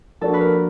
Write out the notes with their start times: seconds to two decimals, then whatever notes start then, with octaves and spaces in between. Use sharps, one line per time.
0.21 F3 A#3 D4 F#4 A4
0.34 B4
0.41 A#4